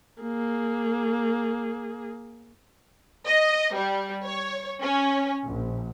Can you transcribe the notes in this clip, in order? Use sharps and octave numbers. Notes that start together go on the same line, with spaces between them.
A#3 G#4
D#5
G3
C#5
C#4
A#1